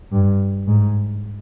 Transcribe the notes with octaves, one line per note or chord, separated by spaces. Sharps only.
G2
G#2